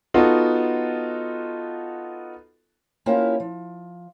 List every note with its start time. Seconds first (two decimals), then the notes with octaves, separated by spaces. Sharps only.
0.14 B3 D#4 F4 F#4 A4
3.06 A#3 C4 C#4 E4 F4 G4
3.40 F3